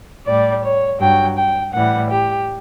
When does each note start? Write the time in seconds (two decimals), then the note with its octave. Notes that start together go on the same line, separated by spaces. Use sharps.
0.25 A2 G3 D5
0.62 C#5
0.99 G2 F#3 G5
1.36 G5
1.73 A2 E3 G3 F#5
2.09 G4